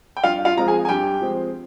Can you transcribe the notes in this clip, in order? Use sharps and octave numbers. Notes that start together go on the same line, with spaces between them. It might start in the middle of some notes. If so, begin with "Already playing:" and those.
G5
G2 F4 F5
F4 F5
F3 G#3 C4 A#5
G#4 G#5
G#5
G2 G4 G5
F3 G#3 C4